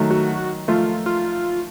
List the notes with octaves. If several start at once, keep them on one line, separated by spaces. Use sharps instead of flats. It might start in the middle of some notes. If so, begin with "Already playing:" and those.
Already playing: D#3 F#3 A3
F#4
F3 A3 F4
F4